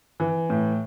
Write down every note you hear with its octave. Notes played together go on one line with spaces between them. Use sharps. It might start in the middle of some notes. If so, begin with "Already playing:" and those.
E3
A2